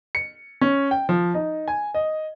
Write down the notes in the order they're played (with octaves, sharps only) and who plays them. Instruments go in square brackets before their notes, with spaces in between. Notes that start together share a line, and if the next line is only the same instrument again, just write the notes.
[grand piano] C#7
C#4
G5
F3
D#4
G#5
D#5